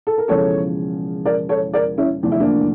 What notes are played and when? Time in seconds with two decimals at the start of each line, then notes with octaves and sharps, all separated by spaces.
0.07 A4
0.18 A#4
0.28 E1 E2 C#3 F3 A4 C#5
1.25 A#4 D5
1.49 A4 C#5
1.74 A#4 D5
1.98 C#4 E4
2.22 F1 E2 D3 F3 D4
2.32 E4
2.40 A#3 D4